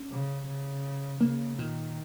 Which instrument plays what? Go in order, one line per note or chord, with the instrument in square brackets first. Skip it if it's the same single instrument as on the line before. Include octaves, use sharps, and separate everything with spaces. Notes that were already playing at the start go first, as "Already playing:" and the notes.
Already playing: [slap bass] C#4
[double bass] C#3
C#3
[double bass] C#3 [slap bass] A#3
[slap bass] A#2 [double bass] D#3